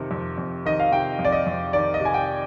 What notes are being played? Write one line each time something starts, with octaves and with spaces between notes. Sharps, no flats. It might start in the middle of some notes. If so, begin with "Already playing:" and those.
Already playing: F2 C3 D#3
F2
F2
D#3 D#5
F5
C3 G5
F2
D5
D#5
F2
D#3 D5
D#5
C3 G#5
G5